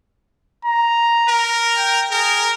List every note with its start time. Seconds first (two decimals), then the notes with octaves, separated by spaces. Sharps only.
0.65 A#5
1.28 A#4
1.77 G5
2.11 G#4 A#4